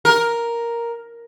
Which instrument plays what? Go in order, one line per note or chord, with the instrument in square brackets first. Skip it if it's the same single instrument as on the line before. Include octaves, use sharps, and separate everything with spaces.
[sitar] A#4